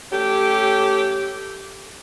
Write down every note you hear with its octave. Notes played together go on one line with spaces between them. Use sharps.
A3 C#4 G4